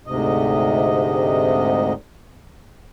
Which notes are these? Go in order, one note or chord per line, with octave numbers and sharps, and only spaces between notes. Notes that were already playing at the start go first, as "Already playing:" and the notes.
D2 G#2 C3 D#5